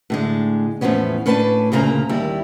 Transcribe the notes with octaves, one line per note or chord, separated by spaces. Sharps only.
A2 D3 G#3
E2 A2 C3 F3 B3 C#4
A2 C#4 D4 B4 C#5 A5
D2 A#2 C#3 A#3 A#5
D#2 G3 E4